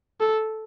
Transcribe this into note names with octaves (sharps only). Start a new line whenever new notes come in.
A4